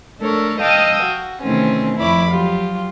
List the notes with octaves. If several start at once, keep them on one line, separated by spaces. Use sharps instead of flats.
A3 D4 A4 A#4 C#5
D#5 F5 G5 A5 D#6 E6
F#4
C3 D#3 E3 A3 C4 C#4
F2 E4 C#5 B5 D6
F#3 F4 G4